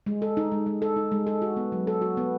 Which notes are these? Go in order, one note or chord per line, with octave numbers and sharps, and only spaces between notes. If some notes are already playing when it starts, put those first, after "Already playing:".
G#3
A4
D#4
G#3
G#3
A4
D#4
G#3
A4
F#4
B3
F#3
A4
F#4
B3